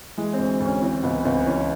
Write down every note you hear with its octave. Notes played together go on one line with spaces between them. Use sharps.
E3 G#3
D2 C4
D2
C#4
E3 C4
C#2 B3
C#2 C4
E3 C#4